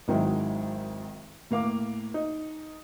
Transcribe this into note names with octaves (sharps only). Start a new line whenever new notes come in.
G#1 D#3 F#3 G#3 E4
A2 A#3 F5 D6
D#4